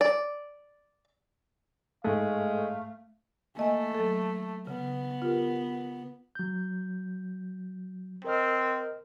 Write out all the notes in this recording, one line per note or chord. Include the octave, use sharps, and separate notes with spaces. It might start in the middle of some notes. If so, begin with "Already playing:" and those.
D5
G#2 G#3 A3 A4 F5
A3 A#3 D#5 G#5
F#3 A4
C#3 B3
F4 G4 A#4
F#3 G6
C4 A#4 D#5 F6